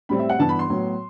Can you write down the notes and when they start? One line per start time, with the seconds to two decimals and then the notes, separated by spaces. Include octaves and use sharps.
0.09 A2 G3 C4 B5
0.19 E5
0.29 F#5
0.39 G2 E3 B3 A5
0.49 B5
0.59 C6
0.70 A2 F#3 B3